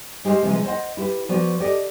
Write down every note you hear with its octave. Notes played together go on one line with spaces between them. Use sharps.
G#3 G4 C5 E5 F5
C3 E3 F3 G#3
C5 D#5 E5 F#5
E4 G4 B4
F3 B3 F#4 D5
G4 A4 D5 D#5